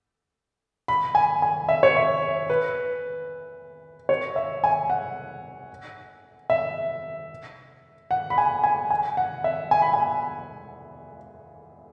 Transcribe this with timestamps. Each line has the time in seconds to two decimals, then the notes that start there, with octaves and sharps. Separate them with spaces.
0.88 B5
1.15 G#5
1.42 G#5
1.69 E5
1.83 C#5
1.96 E5
2.50 B4
4.09 C#5
4.36 E5
4.64 G#5
4.90 F#5
6.50 E5
8.11 F#5
8.30 B5
8.38 G#5
8.64 G#5
8.90 G#5
9.17 F#5
9.44 E5
9.71 G#5
9.82 B5
9.94 G#5